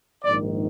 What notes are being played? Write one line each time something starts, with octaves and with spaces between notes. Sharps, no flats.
A#1 G#2 D#3 D5